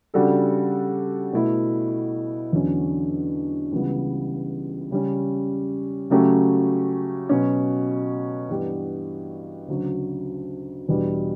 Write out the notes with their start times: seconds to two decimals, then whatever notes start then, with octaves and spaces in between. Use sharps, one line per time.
0.14 C#3 G3 D4 F#4 A4
1.33 B2 A3 E4
2.52 E2 D3 F#3 C#4
3.72 C#2 C#3 E3 G3 B3
4.91 C#3 G3 C#4
6.10 C#3 F#3 A3 C#4 G4
7.29 B2 F#3 C#4
8.49 G2 E3 B3 D4 G4
9.68 D2 C#3 F#3
10.88 E2 B2 G3 D4